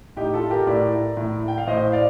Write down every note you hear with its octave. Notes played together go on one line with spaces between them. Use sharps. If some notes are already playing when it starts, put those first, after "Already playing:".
A2 D#4 G4
F4 A4
G4 A#4
A2 A#4 D5
A2
G5
F5
A2 C5 D#5
D5 F5